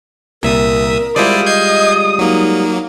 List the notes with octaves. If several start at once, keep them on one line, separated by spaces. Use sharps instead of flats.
C2 A#2 A#4 E5 D#6
G3 G#3 E4 F4 C5 D5 D#6
D#5 G6 G#6 C7
F#3 A#3 D#4